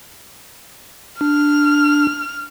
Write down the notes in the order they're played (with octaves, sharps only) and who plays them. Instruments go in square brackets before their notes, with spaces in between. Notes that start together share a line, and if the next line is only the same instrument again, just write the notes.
[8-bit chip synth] D4 [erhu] F6